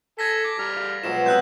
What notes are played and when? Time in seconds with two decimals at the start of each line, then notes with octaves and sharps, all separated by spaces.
0.19 A4 G#5 G#6 A#6 B6
0.44 D6
0.59 G3 A#5 F6
0.76 F5
1.04 B2 F3 F#3 G#3 E7
1.26 C3 B3 D#5 E6 F#6 G6